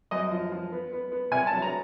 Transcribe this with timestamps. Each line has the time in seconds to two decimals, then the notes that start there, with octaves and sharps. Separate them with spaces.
0.11 F#2 D#5
0.31 F3
0.51 F3
0.72 B3
0.92 B3
1.12 B3
1.31 C3 G#5
1.47 A5
1.53 F#3
1.62 A#5